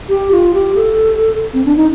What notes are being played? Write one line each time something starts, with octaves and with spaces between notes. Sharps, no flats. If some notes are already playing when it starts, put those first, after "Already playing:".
G4
F4
G4
A4
C4
D4
D#4